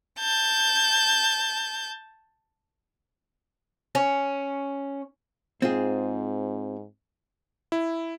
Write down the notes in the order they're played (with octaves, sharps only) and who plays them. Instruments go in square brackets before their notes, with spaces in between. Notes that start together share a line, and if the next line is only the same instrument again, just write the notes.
[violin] A5 G6
[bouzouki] C#4
[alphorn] G#2 [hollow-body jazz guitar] C4 F4 G#4
[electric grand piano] E4